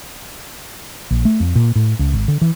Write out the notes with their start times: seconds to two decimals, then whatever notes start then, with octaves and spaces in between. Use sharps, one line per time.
1.11 A#1
1.25 A3
1.40 F2
1.55 A#2
1.75 A2
1.99 C#2
2.14 G#1
2.28 D3
2.41 E3